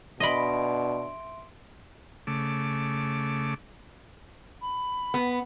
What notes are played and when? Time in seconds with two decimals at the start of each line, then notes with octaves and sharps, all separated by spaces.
0.20 B2 D4 D#5 E5 B5 C6 D7
2.27 C#3 A3 D6
4.62 B5
5.14 B3